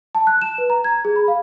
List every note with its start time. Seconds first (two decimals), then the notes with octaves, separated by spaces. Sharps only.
0.15 A5
0.27 F#6
0.42 E7
0.58 B4
0.70 A#5
0.84 G#6
1.05 G#4
1.16 B5
1.28 F5